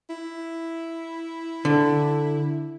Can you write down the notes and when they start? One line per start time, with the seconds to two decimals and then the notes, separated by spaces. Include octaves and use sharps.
0.09 E4
1.65 D3